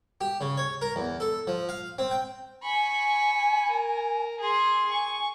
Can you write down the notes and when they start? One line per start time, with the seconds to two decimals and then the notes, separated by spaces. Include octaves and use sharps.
0.21 G4
0.41 C#3
0.57 C#5
0.81 A#4
0.96 E2
1.20 A4
1.47 F3
1.69 F5
1.99 C4
2.11 G5
2.63 G#5 B5 C#6
3.70 A#4
4.40 G#4 C6
4.91 G#5 C#6